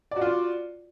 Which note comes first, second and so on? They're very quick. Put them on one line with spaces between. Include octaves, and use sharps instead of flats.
D5 F#4 F4